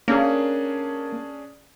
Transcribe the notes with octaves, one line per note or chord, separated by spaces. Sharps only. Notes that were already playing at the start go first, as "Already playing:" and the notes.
A#3 C#4 D4 G#4